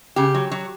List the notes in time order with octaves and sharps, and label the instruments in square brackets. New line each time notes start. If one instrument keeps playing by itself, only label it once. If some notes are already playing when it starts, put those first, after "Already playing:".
[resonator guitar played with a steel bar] C#3 G4
F#3
F#3